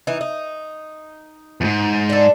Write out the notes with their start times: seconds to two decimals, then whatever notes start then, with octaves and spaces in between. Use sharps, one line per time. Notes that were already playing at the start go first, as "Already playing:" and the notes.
0.07 E3 D#4
0.21 D#4
1.61 E2 G#2
2.10 D4 A4